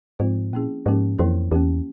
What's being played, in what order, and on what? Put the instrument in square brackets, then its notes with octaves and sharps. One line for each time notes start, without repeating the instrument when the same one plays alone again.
[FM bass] G#2 [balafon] F3 C4 F4 C5
[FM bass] A#2 [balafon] A#3 C#4 E4 G#4
[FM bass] G#2 [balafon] F3 A#3 C#4 G4 A#4
[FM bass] F2 [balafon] E3 A#3 E4 A#4 C#5
[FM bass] E2 [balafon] A#3 C#4 G4